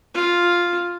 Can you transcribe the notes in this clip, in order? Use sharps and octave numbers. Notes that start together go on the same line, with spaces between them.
F4